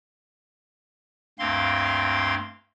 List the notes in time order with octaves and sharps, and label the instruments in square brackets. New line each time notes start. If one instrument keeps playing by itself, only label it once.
[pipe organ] D2 G2 A#3 C4 F5 C6